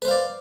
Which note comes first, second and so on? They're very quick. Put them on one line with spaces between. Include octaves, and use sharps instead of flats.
B4 C5 F5 D5